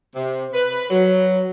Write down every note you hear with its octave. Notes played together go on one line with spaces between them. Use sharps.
C3
B4
F#3